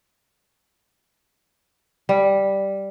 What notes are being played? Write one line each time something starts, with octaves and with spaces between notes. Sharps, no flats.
G3